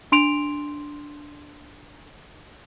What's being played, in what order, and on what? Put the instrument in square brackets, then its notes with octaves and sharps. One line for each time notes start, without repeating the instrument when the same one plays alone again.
[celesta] D4 C6 D7 F7